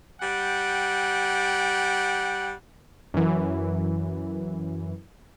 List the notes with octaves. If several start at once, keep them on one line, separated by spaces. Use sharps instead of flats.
G3 F#5 G5
F#2 E3